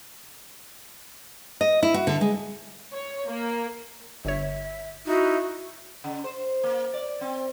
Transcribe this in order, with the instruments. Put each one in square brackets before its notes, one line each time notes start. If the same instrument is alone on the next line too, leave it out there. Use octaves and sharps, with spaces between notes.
[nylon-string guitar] D#5
E4
F#4
D3
G#3
[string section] C#5
A#3
[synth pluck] G1 C#5 [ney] E5
[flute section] D#4 E4 E5 [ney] F#4
[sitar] C#3
C5
A#3
D5
C4